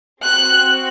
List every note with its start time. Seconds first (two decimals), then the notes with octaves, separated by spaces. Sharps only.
0.23 C4 F#4 F#6